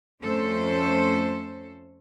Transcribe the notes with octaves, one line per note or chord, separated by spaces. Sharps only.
F2 A3 C#4 A4 C5